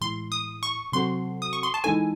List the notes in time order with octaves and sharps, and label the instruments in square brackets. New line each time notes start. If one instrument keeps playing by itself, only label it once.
[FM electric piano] A2 E3 G#3 [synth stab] C6
[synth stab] D#6
C#6
[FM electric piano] C3 F#3 C4 F#4 A4 [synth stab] C6
[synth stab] D#6
C#6
C6
A5
[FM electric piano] E3 G#3 D#4 A4 [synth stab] G#5